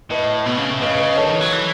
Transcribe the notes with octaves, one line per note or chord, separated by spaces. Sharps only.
A2 B4 D#5
B2
C#3
A2
C#3 B4 D#5
B4 D#5
D#3 A4 C#5
E3
F#3
E3